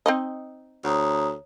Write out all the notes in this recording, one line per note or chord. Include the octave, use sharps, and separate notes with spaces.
C4 D#4 D#5
D2 C#5 A#5 D#6